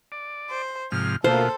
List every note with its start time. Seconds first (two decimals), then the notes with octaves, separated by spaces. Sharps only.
0.12 D5
0.50 C5
0.92 G#2 C3 F3 F6
1.24 D2 B2 A#3 F4 A4 C5